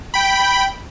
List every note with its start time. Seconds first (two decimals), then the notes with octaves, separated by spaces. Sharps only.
0.14 G5 B5